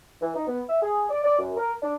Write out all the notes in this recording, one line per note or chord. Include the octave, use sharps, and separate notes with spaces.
E3
D#4
B3
E5
G#4
D5
D5
F#2
A#4
D4